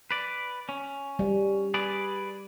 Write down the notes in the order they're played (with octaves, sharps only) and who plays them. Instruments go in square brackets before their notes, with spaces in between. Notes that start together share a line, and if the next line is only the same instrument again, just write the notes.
[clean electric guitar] B4 D5
C#4
[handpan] G3
[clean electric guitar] G#4 B4 D5